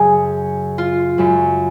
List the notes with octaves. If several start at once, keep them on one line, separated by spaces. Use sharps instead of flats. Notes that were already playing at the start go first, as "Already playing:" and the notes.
Already playing: F#2 C#3 F#3 G#4
F4
F#2 C#3 F#3